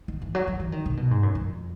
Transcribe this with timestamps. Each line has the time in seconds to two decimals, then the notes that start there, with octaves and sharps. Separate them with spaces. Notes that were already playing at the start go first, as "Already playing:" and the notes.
0.08 D#3
0.22 E3
0.35 F#3
0.47 F#3
0.60 E3
0.72 D#3
0.86 C3
0.97 B2
1.11 G#2
1.23 F#2
1.35 F2